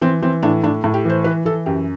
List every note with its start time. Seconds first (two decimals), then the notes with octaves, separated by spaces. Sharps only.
0.01 E3 C4
0.22 E3 C4
0.43 A2 D4
0.64 A2 D4
0.84 A2
0.94 G4
1.05 E3 C5
1.24 E3 B4
1.45 E3 A4
1.66 F#2 G4